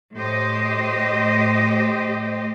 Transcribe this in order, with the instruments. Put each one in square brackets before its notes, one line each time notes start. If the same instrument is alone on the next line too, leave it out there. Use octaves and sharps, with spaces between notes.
[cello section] A2 G4 C5 D#5